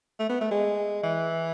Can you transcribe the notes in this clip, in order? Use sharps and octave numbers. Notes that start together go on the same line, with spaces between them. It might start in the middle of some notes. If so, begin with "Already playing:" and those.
A3
B3
A3
G#3
E3